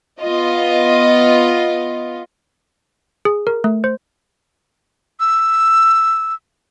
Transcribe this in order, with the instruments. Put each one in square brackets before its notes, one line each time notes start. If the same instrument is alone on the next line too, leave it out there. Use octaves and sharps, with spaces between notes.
[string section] B3 F4 D#5
[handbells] G#4
A#4
A3
C5
[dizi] E6